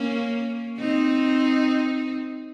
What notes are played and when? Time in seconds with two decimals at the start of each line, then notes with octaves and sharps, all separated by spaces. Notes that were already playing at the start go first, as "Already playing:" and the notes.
Already playing: A#3 C#4
0.79 C4 D#4